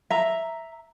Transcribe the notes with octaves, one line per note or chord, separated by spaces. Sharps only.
E5 A#5